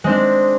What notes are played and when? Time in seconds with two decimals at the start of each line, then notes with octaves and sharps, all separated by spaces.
0.04 G#3
0.07 C4
0.09 D4